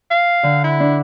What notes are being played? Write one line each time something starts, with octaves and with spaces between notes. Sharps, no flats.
F5
D3 F#5
E4
D4